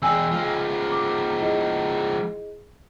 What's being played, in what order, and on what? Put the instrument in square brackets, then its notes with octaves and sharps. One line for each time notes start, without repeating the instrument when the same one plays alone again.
[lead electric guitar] E2 G#3 [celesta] G5 G#5 E6
[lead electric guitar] F3 G#3
[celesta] D6
E4 G#4 D#5